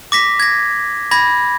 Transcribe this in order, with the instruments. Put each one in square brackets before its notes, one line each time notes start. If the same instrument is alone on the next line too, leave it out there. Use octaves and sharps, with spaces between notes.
[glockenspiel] D6 A#6 B6
G#6 A#6
B5 G#6 A#6